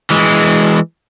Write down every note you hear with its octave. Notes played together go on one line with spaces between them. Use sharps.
E3 G#3